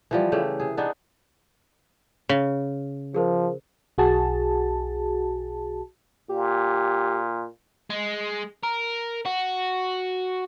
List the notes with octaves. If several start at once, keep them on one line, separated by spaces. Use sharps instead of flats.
E3 F3 G3
C#3 E3 A3 G4
C3 G#4
B3 D4 D#4 G#4
C#3
F3 G#4 A#4 C5
B1 F#4 G#4 A5
A#2 G4
G#3
A#4
F#4